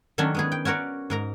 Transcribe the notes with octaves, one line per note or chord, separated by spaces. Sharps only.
D#3 F#3 A3 C#4 D4
G#3 B3 G#4
G5
C#4 F#4 A#4 C#5 D5
G#2 A#4 A#5